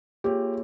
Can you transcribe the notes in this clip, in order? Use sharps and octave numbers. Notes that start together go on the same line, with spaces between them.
A#3 F4 G4 G#4 C#5